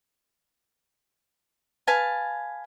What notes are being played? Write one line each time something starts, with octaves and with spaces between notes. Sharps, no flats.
B4 F5 G#5 A5